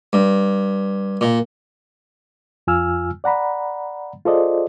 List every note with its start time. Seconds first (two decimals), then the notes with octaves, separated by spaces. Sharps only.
0.13 G2
1.21 A#2
2.67 F2 F4 G#5 E6 F6
3.24 D5 F#5 A#5 B5
4.25 F4 G#4 A4 C5 D5 D#5